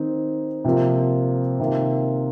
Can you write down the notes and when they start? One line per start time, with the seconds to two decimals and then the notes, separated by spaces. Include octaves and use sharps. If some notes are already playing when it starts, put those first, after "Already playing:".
Already playing: D#3 C4 D#4
0.64 C3 F3 A#3 F4
1.60 C3 D#3 A#3 F4